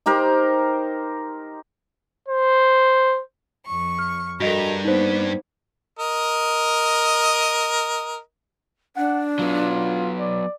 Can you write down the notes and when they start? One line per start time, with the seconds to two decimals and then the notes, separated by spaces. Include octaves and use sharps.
0.06 D#4 G4 A#4 C5
2.28 C5
3.66 F2 C#6
3.99 F6
4.40 G2 F#4 A4 A#4 D#5 A#5
4.85 A#3 B3 D#4 C5
5.99 A#4 D#5
8.96 D4 F#5
9.39 F#3 B3 F4
10.19 D5